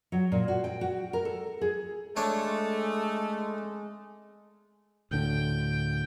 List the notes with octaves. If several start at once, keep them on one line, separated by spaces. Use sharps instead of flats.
F#3
A#2
F#4
G5
F#4
A#4
A4
G#4
G#3 A3 D4 C#5
D2 A2 D3 G5